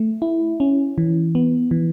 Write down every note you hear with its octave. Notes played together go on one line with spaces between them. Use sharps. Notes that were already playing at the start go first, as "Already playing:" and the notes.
Already playing: A3
E4
C#4
E3
B3
E3